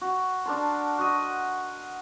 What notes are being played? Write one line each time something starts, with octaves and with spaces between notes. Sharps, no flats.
F#4
D4 A#4 A5 C6
F#4 D#5